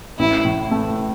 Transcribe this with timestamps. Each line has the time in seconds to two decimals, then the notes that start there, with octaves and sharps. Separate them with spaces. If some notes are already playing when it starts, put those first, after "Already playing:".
0.19 A1 E4
0.45 A2
0.71 A3